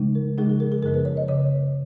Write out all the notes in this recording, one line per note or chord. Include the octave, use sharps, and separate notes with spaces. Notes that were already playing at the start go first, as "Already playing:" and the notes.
Already playing: C#3 F3 G#3 D#4
A#4
C#3 F3 G#3 D#4 G#4
G#4
A#4
G#4
F#2 C#3 F3 B3 A#4
B4
C#5
D#5
C#3 C#5